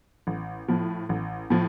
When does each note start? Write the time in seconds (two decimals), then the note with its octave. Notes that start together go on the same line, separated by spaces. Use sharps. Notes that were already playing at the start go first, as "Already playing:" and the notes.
0.27 A1
0.68 A2 F3
1.09 A1
1.50 A2 F3